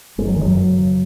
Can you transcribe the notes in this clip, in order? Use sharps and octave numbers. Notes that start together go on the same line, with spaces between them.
F#1 G#3
F#3
D#3
F#2 F#3
C#3